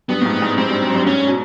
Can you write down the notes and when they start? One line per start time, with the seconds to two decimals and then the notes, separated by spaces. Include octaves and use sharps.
0.09 G2 B3
0.22 A2
0.25 G#2
0.42 G#2
0.57 G#2 C4
0.70 G2
0.82 F#2
0.94 G2
1.07 G#2 C#4
1.27 B2